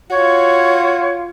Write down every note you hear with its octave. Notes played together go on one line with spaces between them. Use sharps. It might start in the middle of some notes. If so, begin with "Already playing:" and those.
F4 F#4 C#5